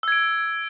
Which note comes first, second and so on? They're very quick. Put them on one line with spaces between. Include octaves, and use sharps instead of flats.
E6 G#6 D7